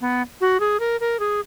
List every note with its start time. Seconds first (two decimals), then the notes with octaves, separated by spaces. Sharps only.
0.01 B3
0.41 F#4
0.60 G#4
0.80 A#4
1.00 A#4
1.20 G#4